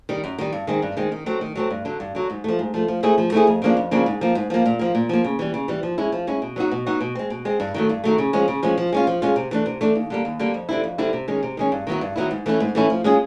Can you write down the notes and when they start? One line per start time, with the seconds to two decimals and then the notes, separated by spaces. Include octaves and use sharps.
0.09 D#3 G3
0.24 F#2
0.38 D#3 G3
0.53 G2
0.67 D#3 G#3 C4
0.82 G2
0.97 D#3 G#3 C4
1.12 D#3
1.26 F#3 A3 C4
1.41 D#3
1.55 F#3 A3 C4
1.71 G2
1.85 D3 F#3
2.00 G2
2.15 D3 F#3
2.30 G#2
2.44 F3 A3
2.59 G#2
2.74 F3 A3
2.88 F3
3.03 A3 C4 E4 G#4
3.18 F3
3.32 A3 C4 E4 G#4
3.47 F2
3.62 C#3 F3 A#3 D4
3.77 F2
3.91 C#3 F3 A#3 D4
4.06 G#2
4.21 F3 A#3
4.35 G#2
4.50 F3 A#3
4.66 A#2
4.79 F3 A#3
4.95 A#2
5.09 F3 A#3
5.24 C#3
5.39 E3 G3
5.54 C#3
5.68 E3 G3
5.83 F3
5.98 G#3 C#4 E4
6.12 F3
6.27 G#3 C#4 E4
6.42 B2
6.56 F#3 B3 D#4 F#4
6.71 B2
6.86 F#3 B3 D#4 F#4
7.01 B2
7.15 G#3 C4
7.30 B2
7.45 G#3 C4
7.60 G2
7.74 D#3 F#3 A3
7.89 G2
8.04 D#3 F#3 A3
8.18 C#3
8.33 F3 G#3 C#4
8.48 C#3
8.63 F3 G#3 C#4
8.78 F3
8.92 G#3 C#4 F4
9.07 F3
9.22 G#3 C#4 F4
9.36 C3
9.51 E3 A3 D4
9.66 C3
9.81 E3 A3 D4
9.95 D#2
10.10 D3 G3 A#3
10.25 D#2
10.39 D3 G3 A#3
10.54 F2
10.69 D3 G3 C4 E4
10.84 F2
10.98 D3 G3 C4 E4
11.13 C3
11.28 D#3 G#3 C#4
11.43 C3
11.57 D#3 G#3 C#4
11.72 G2
11.87 D#3 F#3 B3 E4
12.01 G2
12.16 D#3 F#3 B3 E4
12.31 G#2
12.46 E3 A3 C#4 E4
12.60 G#2
12.75 E3 A3 C#4 E4
12.90 F3
13.04 G#3 C#4 F4 G#4